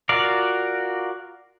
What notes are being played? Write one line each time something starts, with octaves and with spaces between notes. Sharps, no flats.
F4 F#4 A#4 D5 F5